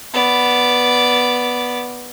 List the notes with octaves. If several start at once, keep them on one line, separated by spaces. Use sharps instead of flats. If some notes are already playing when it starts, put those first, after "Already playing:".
B3 D5